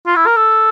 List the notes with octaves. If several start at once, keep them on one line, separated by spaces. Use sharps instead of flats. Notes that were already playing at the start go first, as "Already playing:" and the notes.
F4
E4
A#4
A4